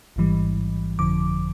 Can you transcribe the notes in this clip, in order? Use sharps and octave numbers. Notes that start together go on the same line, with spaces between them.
A1 G#2 E3 G3
G1 F2 D3 F3 D6